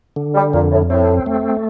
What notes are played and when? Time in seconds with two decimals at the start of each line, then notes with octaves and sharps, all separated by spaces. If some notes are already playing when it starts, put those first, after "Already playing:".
0.16 D3
0.35 G3
0.53 F2 A#2
0.72 A2
0.90 A2 C4
1.26 A3